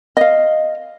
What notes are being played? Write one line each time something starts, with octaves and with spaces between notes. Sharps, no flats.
D#5 F5